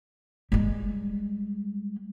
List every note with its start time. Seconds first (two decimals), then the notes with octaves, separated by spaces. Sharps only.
0.52 G3 G#3